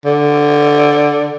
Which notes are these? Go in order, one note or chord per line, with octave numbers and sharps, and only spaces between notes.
D3